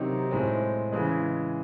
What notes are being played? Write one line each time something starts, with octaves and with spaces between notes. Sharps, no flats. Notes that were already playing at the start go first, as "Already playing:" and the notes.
Already playing: C3 D#3 F#3 C4 D#4
A2 G#3 C4
C#3 E3 G#3